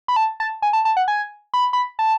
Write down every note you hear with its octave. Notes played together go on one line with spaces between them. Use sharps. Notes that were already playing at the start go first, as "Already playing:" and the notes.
B5
A5
A5
G#5
A5
A5
F#5
G#5
B5
B5
A5